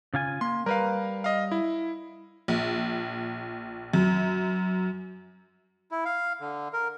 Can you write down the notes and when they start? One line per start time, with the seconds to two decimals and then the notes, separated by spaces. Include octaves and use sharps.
0.14 C#3 F4 G#5
0.41 A#3 C6
0.66 G3 A#4 B4 F5
1.24 D#5 F5
1.52 E4
2.48 A#1
3.93 F#2
5.91 E4
6.05 F5
6.40 D3
6.73 A#4